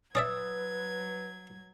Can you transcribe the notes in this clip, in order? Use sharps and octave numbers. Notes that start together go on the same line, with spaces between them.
F#3 C#4 B4 D5 E5 D#6 E6 G#6